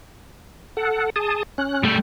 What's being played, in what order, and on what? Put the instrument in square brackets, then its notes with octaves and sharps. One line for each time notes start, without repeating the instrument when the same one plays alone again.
[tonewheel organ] A4 F#5
G#4 A5 D#6
C#4 F#6
[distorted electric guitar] G3 A3